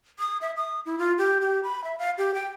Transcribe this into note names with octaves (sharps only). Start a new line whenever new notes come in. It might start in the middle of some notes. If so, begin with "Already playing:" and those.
D#6
E5
D#6
E4
F4
G4
G4
B5
E5
F5
G4
G5